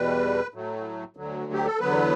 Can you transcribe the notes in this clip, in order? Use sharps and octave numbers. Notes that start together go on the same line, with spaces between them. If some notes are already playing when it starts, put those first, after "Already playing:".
Already playing: E2 B2 G3 B4
A2 F#3 A3
D2 D3 F#3
G4
A4
E2 D3 F#3 B3 B4